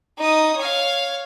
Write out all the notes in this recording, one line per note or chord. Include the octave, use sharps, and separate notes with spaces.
D#4 D#6
C#5 F5